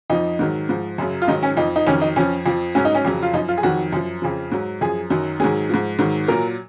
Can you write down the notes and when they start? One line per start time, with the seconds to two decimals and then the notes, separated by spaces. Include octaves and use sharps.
0.10 F2 F3 D#4
0.39 G#2 D#3 F#3
0.69 G#2 F3
0.98 F#2 C#3 F#3
1.22 F4
1.28 G#2 D#3 F#3 D#4
1.43 C#4
1.57 F2 F3 D#4
1.76 D#4
1.87 F2 D#3 F#3 C#4
2.02 D#4
2.16 F2 F3 C#4
2.46 F2 F3
2.75 G#2 F#3 C#4
2.85 D#4
2.95 C#4
3.05 F2 C#3 F#3
3.23 F4
3.34 F#2 F3 D#4
3.49 F4
3.58 G#4
3.63 F2 D#3 F#3 F#4
3.92 F#2 F3
4.22 F2 C#3 F3
4.52 G#2 F#3
4.81 F#2 F3 G#4
5.10 F#2 D#3 F#3
5.40 G#2 D#3 F#3 G#4
5.69 G#2 F3
5.99 G#2 D#3 F#3
6.28 A#2 F#3 A#4